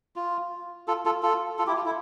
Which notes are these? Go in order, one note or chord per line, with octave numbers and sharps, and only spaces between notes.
F4
F4 A4
F4 A4
F4 A4
F4 A4
E4 G4
F4
E4